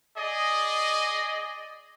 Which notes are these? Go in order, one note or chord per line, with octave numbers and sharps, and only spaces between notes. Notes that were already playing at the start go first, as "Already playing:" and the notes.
G#4 D5 D#5